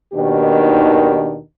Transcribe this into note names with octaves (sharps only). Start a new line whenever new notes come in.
D#2 B2 D#3 D4 G4